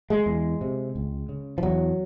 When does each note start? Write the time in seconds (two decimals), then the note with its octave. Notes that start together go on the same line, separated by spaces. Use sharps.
0.10 G#3
0.26 E2
0.61 C3
0.95 C#2
1.29 C#3
1.58 F3
1.63 E2 F#3